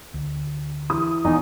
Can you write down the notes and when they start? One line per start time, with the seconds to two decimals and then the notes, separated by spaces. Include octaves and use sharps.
0.14 D2
0.90 E3 D#6
1.25 D#1 E2 D#4